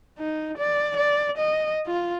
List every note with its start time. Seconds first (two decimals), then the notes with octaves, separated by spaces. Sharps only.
0.19 D#4
0.57 D5
0.97 D5
1.38 D#5
1.87 F4